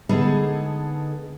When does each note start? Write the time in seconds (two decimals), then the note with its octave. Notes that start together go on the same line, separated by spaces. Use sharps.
0.09 D3 G#3 B3 D#4 G#4 A4